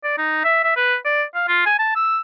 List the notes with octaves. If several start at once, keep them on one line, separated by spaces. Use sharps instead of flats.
D5
D#4
E5
E5
B4
D5
F5
F4
G#5
A5
E6